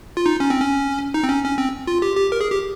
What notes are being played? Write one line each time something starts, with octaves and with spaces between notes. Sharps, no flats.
F4
D#4
C#4
C4
C#4
D#4
C4
C#4
C#4
C4
F4
G4
G4
A#4
G#4
G4